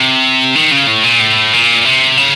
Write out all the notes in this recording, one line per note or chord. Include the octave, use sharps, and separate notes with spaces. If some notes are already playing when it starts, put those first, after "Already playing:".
Already playing: C3
D#3
C#3
A2
A#2
A2
A#2
C3
C#3